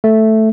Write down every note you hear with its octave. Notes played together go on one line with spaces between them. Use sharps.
A3